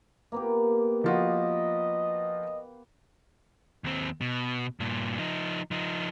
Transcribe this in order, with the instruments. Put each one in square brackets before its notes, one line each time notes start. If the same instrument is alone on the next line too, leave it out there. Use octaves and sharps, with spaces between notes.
[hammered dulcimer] A#3 B3 G4
[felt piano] F3 F4 F#4 [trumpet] D#5
[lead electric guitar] D#2 C4
B2
G2 A#2
F3 D#4
F3 D#4